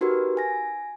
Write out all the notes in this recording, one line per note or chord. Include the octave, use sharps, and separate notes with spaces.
D#4 F#4 G4 A#4 B4
G#5 A#6